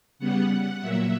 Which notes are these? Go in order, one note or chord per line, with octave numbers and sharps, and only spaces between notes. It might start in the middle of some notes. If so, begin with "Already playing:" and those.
C#3 G3 B3 F#5
A#2 F#3 A#3 E5